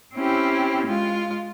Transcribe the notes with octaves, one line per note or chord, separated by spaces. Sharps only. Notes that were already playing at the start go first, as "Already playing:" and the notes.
C4 C#4 E4 G4
G#3 F4